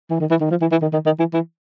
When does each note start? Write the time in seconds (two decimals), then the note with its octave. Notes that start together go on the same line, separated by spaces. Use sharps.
0.10 E3
0.20 D#3
0.30 E3
0.41 D#3
0.51 F3
0.61 E3
0.72 E3
0.82 D#3
0.93 D#3
1.06 D#3
1.19 E3
1.34 E3